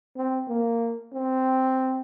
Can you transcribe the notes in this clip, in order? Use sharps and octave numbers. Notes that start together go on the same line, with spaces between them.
C4
A#3
C4